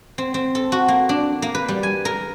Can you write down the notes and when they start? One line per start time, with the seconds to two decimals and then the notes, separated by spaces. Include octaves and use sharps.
0.18 C4
0.34 C4
0.55 A4
0.72 F#4
0.88 A#3
1.09 D4
1.42 A#3
1.55 B4
1.68 G3
1.83 G#5
2.05 A#4